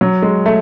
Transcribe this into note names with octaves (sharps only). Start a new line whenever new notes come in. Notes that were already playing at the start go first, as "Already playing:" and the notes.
F#3
G#3
A3